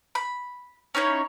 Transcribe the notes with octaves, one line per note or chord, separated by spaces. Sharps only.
B5
C#4 D#4 E4 C#5